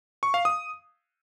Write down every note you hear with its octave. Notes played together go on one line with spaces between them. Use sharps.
C#6
F5
D#6